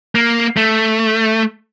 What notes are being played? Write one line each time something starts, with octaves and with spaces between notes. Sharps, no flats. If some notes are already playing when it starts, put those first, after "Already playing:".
A#3
A3